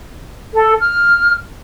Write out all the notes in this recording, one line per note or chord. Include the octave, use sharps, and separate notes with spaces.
A4
F6